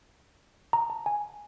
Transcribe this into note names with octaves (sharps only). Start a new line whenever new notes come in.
A#5
A5
G#5